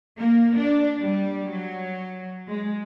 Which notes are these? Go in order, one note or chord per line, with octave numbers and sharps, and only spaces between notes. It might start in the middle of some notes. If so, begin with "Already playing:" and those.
A#3
D4
G3
F#3
G#3